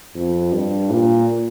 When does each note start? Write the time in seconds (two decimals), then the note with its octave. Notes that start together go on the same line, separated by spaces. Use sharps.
0.15 F2
0.52 G2
0.90 A#2